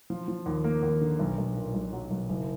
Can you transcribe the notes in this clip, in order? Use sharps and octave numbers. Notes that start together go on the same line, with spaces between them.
F3
F3
D#2
A#3
D#2
D3
B1
B1
A#2
B1
F#3
B1
F#1